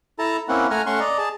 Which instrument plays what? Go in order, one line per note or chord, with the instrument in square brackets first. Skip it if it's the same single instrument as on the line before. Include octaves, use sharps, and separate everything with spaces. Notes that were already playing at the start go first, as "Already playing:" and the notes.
[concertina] E4 A4 A5 A#5
A#3 C4 C#4 E4 F#5
A3 F#5 G#5 A#5 F6
A3 C#4 F#5 C6 C#6
D5 D#5 A#5
G#4 A5